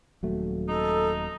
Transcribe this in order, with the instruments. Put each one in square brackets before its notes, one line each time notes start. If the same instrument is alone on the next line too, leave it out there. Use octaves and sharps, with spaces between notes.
[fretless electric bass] D#1 F#3 A3
[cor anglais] D#4 [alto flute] A4